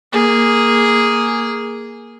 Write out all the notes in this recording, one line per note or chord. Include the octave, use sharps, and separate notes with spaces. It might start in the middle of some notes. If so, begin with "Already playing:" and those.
A#3 G#4